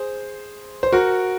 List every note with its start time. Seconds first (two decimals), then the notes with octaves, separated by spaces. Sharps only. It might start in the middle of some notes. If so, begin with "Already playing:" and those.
Already playing: G#4 C5
0.83 C5
0.92 F#4 A#4